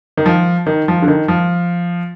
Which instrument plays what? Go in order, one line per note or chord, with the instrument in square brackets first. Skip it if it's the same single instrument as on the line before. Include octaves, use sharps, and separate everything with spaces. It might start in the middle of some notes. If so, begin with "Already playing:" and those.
[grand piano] D#3
F3
D#3
F3
D3
D#3
F3